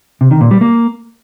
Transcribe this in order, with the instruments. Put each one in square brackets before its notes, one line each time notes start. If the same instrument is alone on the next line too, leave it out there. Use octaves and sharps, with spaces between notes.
[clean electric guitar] C3
D#3
A#2
G3
A#3